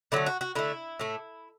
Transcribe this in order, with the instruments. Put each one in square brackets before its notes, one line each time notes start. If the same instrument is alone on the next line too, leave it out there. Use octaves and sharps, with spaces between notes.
[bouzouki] D3 F#3 A3 E4
F#4
F#4
D3 A3 E4
A2 A3